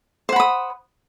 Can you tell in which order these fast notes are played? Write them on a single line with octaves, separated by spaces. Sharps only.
C5 F#5 B5 D#6